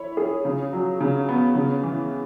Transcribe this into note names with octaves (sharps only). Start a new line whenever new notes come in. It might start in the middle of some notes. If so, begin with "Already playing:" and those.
Already playing: E4 C#5
G#4
C#3
F#3
C#3
B3
C#3
E3